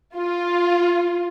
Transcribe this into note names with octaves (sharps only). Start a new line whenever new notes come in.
F4